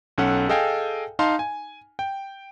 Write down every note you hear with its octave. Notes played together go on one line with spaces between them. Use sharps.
B1 C#4 A4 F#5
G#4 A4 D#5 F5 G5 G#5
D#4 F5 A5 C6
G#5
G5